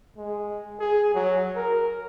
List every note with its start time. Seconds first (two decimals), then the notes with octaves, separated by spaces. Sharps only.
0.17 G#3
0.80 G#4
1.14 F#3
1.55 A#4